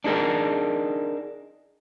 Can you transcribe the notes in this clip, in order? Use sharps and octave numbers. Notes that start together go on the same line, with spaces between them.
D4 D#4 G#4 A#4